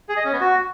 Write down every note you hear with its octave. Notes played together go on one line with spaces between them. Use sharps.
G#4
D#5
C#4
B3
F#4